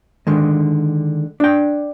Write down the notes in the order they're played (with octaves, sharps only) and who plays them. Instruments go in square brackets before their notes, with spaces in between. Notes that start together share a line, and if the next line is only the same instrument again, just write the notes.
[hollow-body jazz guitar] D3 D#3 G#3
D4 G5